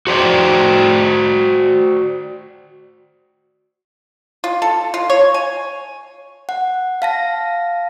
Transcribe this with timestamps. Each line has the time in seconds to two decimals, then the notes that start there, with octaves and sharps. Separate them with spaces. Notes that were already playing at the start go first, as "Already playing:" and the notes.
0.07 F#4 C5 D5 G5
4.44 F4
4.62 A4
4.94 F4
5.10 C#5
5.34 G#5
6.49 F#5
7.02 F5 A5 A#6